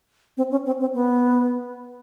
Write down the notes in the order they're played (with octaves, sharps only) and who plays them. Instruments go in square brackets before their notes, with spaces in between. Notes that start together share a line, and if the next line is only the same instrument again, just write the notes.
[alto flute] C4
C#4
C4
C4
B3